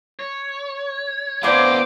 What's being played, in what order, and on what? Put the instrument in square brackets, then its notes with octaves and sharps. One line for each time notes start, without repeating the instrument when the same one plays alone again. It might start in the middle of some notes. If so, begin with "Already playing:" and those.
[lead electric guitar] C#5
[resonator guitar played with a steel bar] A2 C4 D5 [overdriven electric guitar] B3 F5 [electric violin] C5 D6